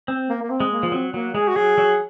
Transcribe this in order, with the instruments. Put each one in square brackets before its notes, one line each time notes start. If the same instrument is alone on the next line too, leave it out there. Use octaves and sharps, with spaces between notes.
[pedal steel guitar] C4
[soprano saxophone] A#3
A#3
C4
[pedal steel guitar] G#3
[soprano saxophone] A#3
[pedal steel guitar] F3
[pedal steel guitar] F#3 [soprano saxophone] C4
[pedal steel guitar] F#3 [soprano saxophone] A#3
[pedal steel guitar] G#3 [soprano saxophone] G#4
[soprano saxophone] F#4
[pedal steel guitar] F#3 [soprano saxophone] G#4
[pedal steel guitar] F#3